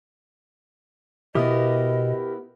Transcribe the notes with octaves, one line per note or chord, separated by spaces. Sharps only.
B2 B3 E4 G4 A#4 D#5 D#6